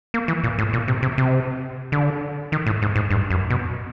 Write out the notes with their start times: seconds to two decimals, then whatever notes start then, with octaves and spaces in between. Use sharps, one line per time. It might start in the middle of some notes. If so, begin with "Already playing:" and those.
0.14 A#3
0.28 E3
0.44 A#2
0.59 A2
0.73 A#2
0.88 C3
1.02 C3
1.18 C3
1.92 D3
2.52 D#3
2.66 A2
2.82 G#2
2.96 G#2
3.10 G2
3.30 F#2
3.50 B2